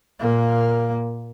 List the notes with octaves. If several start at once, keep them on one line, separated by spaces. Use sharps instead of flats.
A#2 A#3